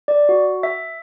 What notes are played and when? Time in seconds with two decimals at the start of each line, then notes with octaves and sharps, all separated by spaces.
0.08 D5
0.29 F#4
0.63 E5